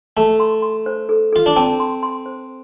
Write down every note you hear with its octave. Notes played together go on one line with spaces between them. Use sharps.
A3 A5
C6
C6
C5
A4
F4 A4
D4
C4 A5
C6
C6
C5